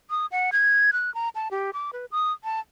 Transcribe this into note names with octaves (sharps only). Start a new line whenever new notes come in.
D#6
F#5
G#6
F#6
A#5
A5
G4
D6
B4
D#6
A5